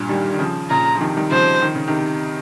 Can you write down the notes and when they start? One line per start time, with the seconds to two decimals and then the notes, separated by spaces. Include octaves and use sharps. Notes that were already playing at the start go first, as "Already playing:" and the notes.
Already playing: G2 A#2
0.09 D#3 G3
0.34 D#3
0.39 C#3 F3
0.70 A#2 C#3 A#5
0.95 F3
1.01 C3 D#3
1.17 D#3 G3
1.31 C#3 F3 C5
1.62 D#3
1.75 C#3
1.88 C3 D#3